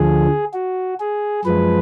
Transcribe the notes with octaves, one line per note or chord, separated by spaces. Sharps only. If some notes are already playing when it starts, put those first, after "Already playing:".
Already playing: D2 D3 F3 G#4
F#4
G#4
F#2 F3 G#3 B4